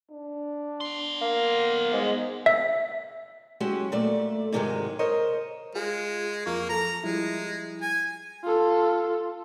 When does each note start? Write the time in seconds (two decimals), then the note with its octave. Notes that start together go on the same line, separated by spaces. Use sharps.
0.11 D4
0.81 B3 C6
1.22 A#3
1.93 G#2 G#3
2.46 E5
3.60 F#3 G#3 C#4 F#4 G4
3.92 A#2 A3 D5
4.52 G#2 C3 D#3 E3 F#3 G#3
4.99 A#4 C5 C#5 D#5
5.75 G#3 F4 G#4
6.46 F2 A#3 F4 C#6
6.69 F3 A4 A#5
7.04 F3 G3 G#3 E4
7.82 G#5
8.44 F4 A4